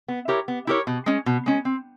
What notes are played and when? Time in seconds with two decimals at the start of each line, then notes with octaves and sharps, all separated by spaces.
0.08 B3
0.28 E4 G4 A#4 C#5
0.48 B3
0.67 E4 G4 A#4 C#5
0.87 B2
1.06 G#3 C#4
1.26 B2
1.46 G#3 C#4
1.65 C4